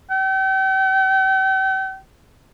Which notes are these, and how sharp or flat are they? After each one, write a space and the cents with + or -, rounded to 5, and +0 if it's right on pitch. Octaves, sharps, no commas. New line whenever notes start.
G5 -40